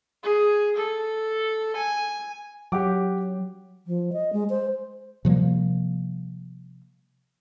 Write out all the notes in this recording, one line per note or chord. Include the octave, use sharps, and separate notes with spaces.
G#4
A4
G#5
F#3 G4 F#5 D6
F3
D#5
G#3
C5
C3 F3 G3 A#3